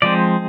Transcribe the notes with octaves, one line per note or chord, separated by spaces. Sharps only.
F3 G#3 C4 D5